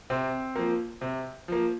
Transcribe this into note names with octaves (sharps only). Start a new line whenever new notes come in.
C3 C4
F3 A#3
C3
F3 A#3